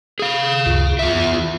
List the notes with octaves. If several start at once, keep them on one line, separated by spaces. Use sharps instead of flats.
G#4 F5
C#2 F#2 F4
E2 F4 E5